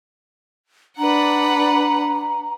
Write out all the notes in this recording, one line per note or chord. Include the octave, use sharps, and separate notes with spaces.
D4 B4 F#5 A#5